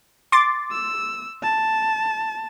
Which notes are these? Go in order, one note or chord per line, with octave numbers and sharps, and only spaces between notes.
C6 D6 A6
E6
A5